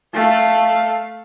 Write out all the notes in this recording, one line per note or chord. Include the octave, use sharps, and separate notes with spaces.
A3 F5